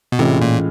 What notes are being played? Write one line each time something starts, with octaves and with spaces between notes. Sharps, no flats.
B2
A2 C3 E3 G#3 C#4 F4
A#2